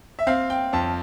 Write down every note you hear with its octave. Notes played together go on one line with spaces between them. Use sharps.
E5
C4 F5
G5
F2 A5